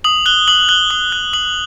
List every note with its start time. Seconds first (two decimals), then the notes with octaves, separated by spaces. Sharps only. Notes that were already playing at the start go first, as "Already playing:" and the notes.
0.04 D#6 F#7
0.26 F#6 G7
0.48 D#6 F#7
0.69 F#6 G7
0.90 D#6 G7
1.12 F#6
1.33 D#6 F#7